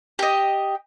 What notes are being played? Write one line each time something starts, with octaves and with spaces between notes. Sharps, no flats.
G4 D#5